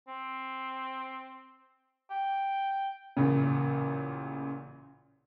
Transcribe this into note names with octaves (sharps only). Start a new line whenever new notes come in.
C4
G5
A1 A#2 C#3